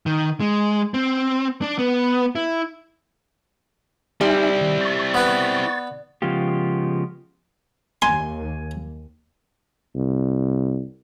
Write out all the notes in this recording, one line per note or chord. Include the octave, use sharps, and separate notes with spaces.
D#3
G#3
C4
D4
B3
E4
G3 C4 D#4 E4 E5 G#5
D#3
C#6 A6
B3 B4
C#3 F3 G#3 B3 F4 G4
D#2 G#5 C6
C2